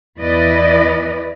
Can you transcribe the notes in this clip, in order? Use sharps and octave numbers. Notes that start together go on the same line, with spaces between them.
E2 E3 E4 B4 D5 D#5